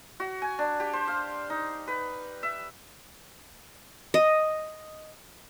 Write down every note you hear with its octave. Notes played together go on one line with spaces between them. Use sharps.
F#4
G#5
D4
G4
C5
F5
D#4
B4
E5
D#5